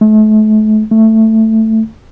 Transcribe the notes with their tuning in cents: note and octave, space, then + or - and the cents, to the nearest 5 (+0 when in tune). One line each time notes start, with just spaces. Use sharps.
A3 -35
A3 +10